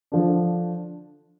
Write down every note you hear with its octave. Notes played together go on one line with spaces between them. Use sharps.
D3 F3 D4